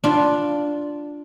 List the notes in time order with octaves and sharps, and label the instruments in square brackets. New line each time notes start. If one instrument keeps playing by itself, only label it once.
[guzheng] D4 F4